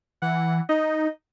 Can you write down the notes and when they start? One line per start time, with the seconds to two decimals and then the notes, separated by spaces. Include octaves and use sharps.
0.22 E3 F#5
0.69 D#4 D#5